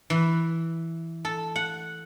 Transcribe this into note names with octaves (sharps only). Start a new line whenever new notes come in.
E3
A4
F#5